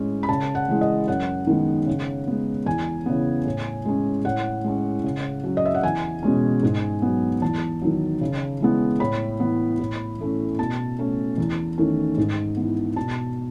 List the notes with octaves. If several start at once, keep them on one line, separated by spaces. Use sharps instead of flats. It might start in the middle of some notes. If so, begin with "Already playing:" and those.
Already playing: A2 G#3 C#4
B5
C#3 A5
F#5
E3 G#3
D#5
F#2 F#5
D#3 G#3 B3
C#3
G#3 B3
E2 G#5
C#3 E3 B3
A2
G#3 C#4
A2 F#5
G#3 C#4
C#3
F#3 C#4
D#5
E5
F#5
E2 G#5
B2 G#3 C#4
G#2
F#3 B3
E2 A5
D#3 F#3
C#3
E3 G#3 B3
A2 B5
E3 B3
A2
E3 A3 C#4
B2 A5
A3 C#4
E2
D#3 A3 C#4
G#2
E3 B3
B2 A5